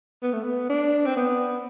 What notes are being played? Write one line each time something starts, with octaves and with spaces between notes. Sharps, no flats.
B3
A3
B3
D4
C4
B3